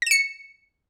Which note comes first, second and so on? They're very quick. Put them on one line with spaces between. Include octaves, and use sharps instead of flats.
A#6 E7 C#7